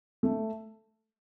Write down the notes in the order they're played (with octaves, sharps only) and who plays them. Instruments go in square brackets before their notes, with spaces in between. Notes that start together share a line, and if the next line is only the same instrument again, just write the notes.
[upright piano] A3